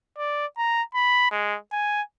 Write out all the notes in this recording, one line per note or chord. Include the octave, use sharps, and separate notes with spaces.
D5
A#5
B5
G#3
G#5